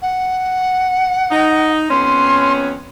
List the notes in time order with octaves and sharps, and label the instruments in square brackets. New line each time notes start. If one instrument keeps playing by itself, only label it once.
[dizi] F#5
[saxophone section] D#4
[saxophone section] F2 B3 C#4 [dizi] C6